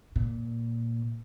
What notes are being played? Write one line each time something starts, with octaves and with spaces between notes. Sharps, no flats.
A#2